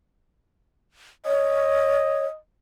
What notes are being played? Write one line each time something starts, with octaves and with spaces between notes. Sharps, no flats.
C#5 D#5